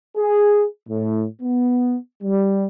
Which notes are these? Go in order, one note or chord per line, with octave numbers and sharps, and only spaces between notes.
G#4
A2
B3
G3